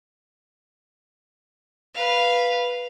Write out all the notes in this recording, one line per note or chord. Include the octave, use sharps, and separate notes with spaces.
B4 F5